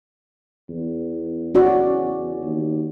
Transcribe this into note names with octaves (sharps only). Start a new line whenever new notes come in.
E2
C#4 F#4 D5
D#2